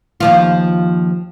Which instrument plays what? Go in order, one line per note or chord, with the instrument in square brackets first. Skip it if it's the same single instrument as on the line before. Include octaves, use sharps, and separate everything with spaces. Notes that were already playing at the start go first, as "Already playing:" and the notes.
[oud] D#2 F3 F4